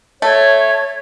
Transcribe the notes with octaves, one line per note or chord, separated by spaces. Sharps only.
A3 C#5